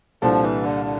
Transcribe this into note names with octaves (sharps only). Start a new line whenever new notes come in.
C2 A#2 F3 G3 D4 A4
E3
D3
D3